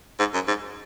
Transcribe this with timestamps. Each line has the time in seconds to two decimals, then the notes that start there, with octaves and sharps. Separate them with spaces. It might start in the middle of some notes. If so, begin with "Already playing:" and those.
0.19 G#2
0.34 F#2
0.48 G#2